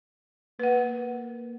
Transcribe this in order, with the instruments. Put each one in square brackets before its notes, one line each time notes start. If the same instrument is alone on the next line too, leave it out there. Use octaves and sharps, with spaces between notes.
[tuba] A#3 [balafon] B4 F#5